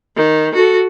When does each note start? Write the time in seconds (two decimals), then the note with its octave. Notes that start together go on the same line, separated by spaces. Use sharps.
0.16 D#3
0.55 F#4 A4